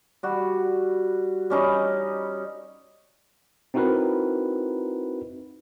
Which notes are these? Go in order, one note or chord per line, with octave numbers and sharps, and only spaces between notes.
G3 F#4
G3 C#4 D#4
C4 D#4 E4 F#4 A#4 B4